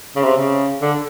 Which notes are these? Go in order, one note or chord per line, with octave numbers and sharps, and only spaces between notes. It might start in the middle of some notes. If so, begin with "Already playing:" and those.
C#3
C3
C#3
D3